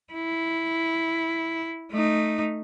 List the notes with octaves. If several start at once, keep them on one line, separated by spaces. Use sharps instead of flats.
E4
A3 D#4